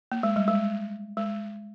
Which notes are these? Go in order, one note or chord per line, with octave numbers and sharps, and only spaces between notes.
A#3
G#3
G3
G#3
G#3